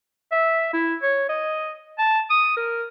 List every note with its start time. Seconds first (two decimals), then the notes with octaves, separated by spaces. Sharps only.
0.32 E5
0.73 E4
1.02 C#5
1.29 D#5
1.98 A5
2.30 D#6
2.57 A#4